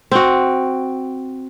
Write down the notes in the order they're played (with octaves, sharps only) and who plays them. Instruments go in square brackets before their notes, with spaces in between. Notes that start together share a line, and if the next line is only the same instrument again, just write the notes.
[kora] C4 F#4